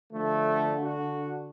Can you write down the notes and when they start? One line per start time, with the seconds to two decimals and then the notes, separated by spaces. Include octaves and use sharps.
0.13 D3 F3 A3
0.81 D4 F#4